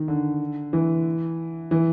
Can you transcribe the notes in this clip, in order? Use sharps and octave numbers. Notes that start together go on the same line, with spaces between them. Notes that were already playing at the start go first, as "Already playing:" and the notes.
Already playing: D#3
D3
E3
E3